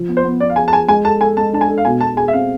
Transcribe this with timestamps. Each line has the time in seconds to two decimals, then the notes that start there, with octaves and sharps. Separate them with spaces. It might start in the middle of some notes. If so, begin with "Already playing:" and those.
Already playing: F3
0.09 B3
0.17 C5
0.24 B3
0.40 B3 D5
0.50 F5
0.56 G#4 G#5
0.68 A5
0.72 G#4 G#5
0.88 G#3 G#5
1.04 A4 A5
1.21 A4 G#5
1.37 G#3 A5
1.53 D4 A5
1.61 G#5
1.68 A4
1.78 F5
1.85 B2 G#5
2.01 B2 A5
2.17 G#4 G#5
2.28 E5
2.33 C4 F5